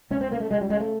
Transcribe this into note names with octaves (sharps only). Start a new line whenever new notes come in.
C#2 C#4
C4
C#3 A#3
A3
C#2 G#3
G3
C#3 G#3
A3